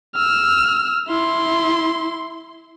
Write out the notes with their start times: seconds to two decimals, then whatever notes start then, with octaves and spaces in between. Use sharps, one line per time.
0.15 E6 F6
1.08 E4 C6